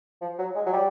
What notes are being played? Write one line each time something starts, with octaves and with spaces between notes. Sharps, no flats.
F3
F#3
G#3
F#3
G3